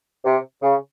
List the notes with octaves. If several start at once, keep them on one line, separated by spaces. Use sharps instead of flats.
C3
C#3